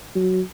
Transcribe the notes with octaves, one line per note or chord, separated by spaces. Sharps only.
F#3